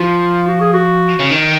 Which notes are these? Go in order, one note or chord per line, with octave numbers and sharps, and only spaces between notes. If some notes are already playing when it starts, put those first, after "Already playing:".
Already playing: F3 F4
F#4
G#4
F#4
C#3
D#3